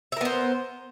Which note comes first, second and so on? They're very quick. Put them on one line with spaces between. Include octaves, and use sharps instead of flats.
E5 A#4 B3 C5